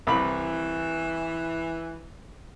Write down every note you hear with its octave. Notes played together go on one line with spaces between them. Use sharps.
C2 E3 B5